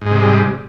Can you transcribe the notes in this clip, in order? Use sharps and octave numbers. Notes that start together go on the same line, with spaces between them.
G#2 C3 G3 G#3